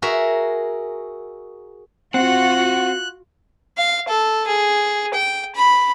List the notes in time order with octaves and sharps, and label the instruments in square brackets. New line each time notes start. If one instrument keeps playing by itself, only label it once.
[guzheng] F#4 G#4 A#4 E5
[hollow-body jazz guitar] C4 [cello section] F4 F#4 [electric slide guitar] F#5 [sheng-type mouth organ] F#6
[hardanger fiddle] F5
A4
G#4
G5
B5